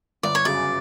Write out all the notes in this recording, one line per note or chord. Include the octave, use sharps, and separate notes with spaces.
G1 D5
C#5
F#2 C#3 D5